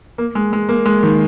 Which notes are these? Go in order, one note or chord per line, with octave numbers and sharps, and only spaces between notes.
A#3
G#3
G#3
A#3
G#3
D#3